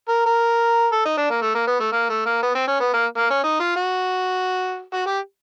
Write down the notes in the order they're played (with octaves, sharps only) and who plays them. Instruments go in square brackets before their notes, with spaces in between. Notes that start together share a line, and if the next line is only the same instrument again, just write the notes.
[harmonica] A#4
A#4
A4
D#4
D4
A#3
A3
A#3
B3
A3
A#3
A3
A#3
B3
C4
C#4
B3
A#3
A#3
C#4
D#4
F4
F#4
F#4
G4